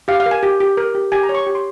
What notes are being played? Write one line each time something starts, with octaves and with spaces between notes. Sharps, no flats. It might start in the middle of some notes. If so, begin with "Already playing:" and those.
G4 F5
F5
A#4
G#5
G4
G4
A#4
G4
G4 G#5
A#5
C#5
C#6
G4
C6